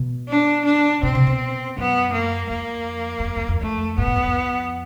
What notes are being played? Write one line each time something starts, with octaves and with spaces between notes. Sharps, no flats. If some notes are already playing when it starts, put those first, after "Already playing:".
Already playing: B2
D4
D4
B2 C4
C3
B2
F#2 B3
A#3
F2 A#3
E2
F2
F2
F2
F2 A3
G#2 B3
A2
E2
F2